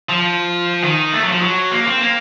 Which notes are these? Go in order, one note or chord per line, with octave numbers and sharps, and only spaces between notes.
F3
D#3
A3
F#3
F3
F#3
A#3
C4
A#3